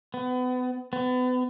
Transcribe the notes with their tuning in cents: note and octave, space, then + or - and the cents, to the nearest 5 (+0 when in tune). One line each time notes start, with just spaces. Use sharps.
B3 +30
B3 +35